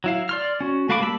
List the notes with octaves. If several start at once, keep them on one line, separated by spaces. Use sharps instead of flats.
F#3 E4 F5
D5 C6 F6
C#4 F#4
A3 F#4 F5 B5 D6
G3 A#3 A5 B5 E6